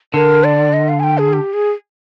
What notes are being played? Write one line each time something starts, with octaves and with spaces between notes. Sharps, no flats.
D3 A#4
D5
D#5
F5
G#5
G5
G#4
G4
G#4